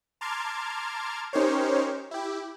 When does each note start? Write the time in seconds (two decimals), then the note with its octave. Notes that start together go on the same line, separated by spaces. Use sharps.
0.21 A5 A#5 C6 D6 F6 G#6
1.33 C#4 D#4 G4 A#4 C5 C#5
2.11 E4 G4